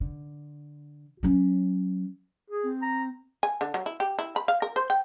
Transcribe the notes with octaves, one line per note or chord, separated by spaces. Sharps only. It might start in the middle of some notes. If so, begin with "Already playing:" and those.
D3
F#3 C#4
G#4
C4
A#5
G#5
D3
F#3
E4
G4
E4
B5
F5
A#4
C5
G5